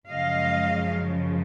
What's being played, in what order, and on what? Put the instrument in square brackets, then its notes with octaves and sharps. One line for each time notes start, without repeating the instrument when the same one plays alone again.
[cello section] F#2 C#3 F3 G#3 D#5 F5